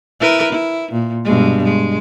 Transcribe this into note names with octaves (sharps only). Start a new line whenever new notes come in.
E4 A#4 B4
E4
A#2
G2 B2 G#3
G#3